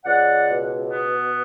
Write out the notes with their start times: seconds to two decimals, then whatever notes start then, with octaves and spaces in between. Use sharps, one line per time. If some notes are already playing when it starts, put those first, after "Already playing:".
0.04 C#2 D5 F#5
0.49 B2
0.92 B3